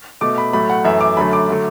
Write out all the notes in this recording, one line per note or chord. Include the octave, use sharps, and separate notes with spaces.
B2 A3 D6
B5
A2 F#3 A3 B5
F#5
F#2 E3 A3 E5
D6
F#2 D3 F#3 A3 B5
D6
D3 F#3 A3